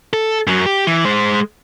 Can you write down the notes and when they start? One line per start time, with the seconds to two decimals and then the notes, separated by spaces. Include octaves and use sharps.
0.13 A4
0.47 F#2 F#3
0.66 G4
0.87 E3
1.05 G#3 C5